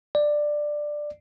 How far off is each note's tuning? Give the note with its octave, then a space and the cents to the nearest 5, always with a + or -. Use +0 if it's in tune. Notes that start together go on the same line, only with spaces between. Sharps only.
D5 +10